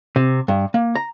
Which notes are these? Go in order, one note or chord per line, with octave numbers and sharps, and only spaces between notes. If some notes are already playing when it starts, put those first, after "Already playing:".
C3
G2
A#3
A#5